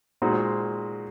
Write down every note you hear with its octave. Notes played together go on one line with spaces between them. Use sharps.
A#2 G#3 D#4 F#4 C5